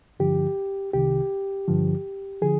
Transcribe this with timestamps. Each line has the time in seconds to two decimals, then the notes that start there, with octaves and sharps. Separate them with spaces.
0.20 G2 D3 F3 G4
0.93 C2 C3 D#3 G4
1.68 G2 D3 F3
2.42 D3 F3 G#4